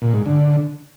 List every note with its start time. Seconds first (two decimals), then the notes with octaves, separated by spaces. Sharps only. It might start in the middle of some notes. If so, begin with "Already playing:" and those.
0.02 A#2
0.14 G#2
0.26 D3